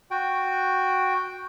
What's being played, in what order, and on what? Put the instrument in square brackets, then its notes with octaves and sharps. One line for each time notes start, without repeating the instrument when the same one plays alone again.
[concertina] F#4 G5